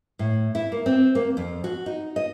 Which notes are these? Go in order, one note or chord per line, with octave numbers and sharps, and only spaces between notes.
A2
E4
A#3
C4
A#3
F2
F#4
D#4
D#5